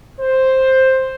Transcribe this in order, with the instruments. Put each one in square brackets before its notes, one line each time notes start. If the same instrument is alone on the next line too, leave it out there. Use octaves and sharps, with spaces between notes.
[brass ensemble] C5